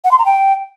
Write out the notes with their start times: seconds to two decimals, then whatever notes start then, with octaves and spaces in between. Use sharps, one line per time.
0.04 F#5
0.11 C6
0.18 A#5
0.25 G5